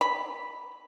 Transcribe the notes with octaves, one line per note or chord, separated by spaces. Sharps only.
B5